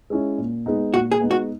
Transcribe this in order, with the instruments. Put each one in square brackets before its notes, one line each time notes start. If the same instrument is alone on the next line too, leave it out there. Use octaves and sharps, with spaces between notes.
[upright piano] G#3 C#4 E4
A#2
G#3 B3 D#4
[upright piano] A#2 [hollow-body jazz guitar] F#4
[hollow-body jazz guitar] G#4
[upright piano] G#3 B3 D#4
[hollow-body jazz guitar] F#4